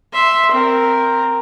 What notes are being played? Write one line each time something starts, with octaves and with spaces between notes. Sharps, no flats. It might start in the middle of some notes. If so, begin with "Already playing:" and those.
E5 C6
C4 A#4